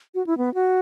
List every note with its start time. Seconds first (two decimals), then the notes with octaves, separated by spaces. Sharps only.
0.15 F#4
0.27 E4
0.38 B3
0.54 F#4